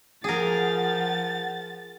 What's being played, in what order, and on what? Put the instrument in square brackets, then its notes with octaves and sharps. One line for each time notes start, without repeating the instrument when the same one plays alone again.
[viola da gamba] F3 [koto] G#4 A#4 [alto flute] F#5 [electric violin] A6